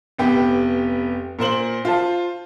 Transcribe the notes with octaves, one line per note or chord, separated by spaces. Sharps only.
F1 B3 G4 G5
A#2 A#4 C5 F#7
F4 C5 A5